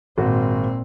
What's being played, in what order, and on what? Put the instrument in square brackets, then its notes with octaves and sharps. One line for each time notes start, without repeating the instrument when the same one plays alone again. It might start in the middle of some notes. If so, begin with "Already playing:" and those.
[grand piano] G#1 F#4 [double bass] A#2 C4